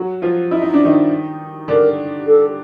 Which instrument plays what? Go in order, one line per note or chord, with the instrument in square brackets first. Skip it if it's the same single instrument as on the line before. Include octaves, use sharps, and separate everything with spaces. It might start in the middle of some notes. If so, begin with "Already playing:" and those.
Already playing: [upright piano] F#3 F#4
F3 F4
[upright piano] E4 [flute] D#5
[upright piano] D#4
D4
D#3 D#4
[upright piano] D3 D4 [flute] A#4
[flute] A4